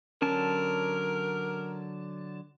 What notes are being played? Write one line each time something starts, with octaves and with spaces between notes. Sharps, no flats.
D3 F#3 C#4 A#4 A5